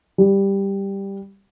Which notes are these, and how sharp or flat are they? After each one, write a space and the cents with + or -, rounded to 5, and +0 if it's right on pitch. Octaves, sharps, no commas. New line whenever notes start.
G3 +5